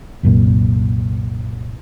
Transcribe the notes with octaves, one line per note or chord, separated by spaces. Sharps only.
C2 F#2 A#2